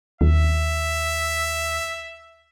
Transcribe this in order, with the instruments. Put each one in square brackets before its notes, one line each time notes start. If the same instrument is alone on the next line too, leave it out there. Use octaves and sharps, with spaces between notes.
[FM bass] D#2 [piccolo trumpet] E5